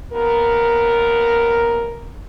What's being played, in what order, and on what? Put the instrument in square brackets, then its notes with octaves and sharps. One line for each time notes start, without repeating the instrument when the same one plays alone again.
[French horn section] D#2 B3 A#4